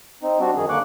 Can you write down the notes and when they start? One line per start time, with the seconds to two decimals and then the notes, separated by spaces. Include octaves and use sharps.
0.23 C4 D#4
0.40 G3 C4 D4 F#4
0.56 F#2 D#3 G#4
0.70 D3 A#3 C#6 D6 F#6